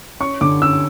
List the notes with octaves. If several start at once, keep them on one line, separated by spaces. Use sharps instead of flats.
C#4 C#6
D3 D6
C#4 E6